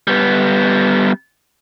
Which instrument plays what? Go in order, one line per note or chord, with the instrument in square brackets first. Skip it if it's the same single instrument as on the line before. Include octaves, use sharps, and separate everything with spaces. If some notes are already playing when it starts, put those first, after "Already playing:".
[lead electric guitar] G3 B3